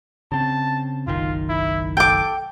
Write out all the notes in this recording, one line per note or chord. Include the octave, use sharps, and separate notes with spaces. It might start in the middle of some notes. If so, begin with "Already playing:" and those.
C#3 C4 A5
F#1 B1 D#3 F4
E4
A4 G5 D6